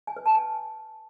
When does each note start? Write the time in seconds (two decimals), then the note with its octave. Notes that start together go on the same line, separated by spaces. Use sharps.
0.07 G#5
0.17 B4
0.26 A5
0.35 G#5